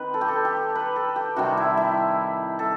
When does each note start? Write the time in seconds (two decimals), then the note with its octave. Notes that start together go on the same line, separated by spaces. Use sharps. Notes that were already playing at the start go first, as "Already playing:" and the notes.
Already playing: D#3 C4 B4
0.14 A4
0.21 G4
0.28 A4
0.45 G4
0.75 B4
0.96 A4
1.16 G4
1.36 C3 D#3 G3 C4 F#4
1.57 E4
1.77 E4
2.59 A4